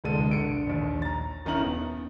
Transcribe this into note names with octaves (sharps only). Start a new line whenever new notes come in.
D1 C2 D3 G#3 A4 D#7
A#1 C#7 D7
A#1 D#2
A#5 A6
D#1 D#3 C#4 E4 A#5 F#7
B3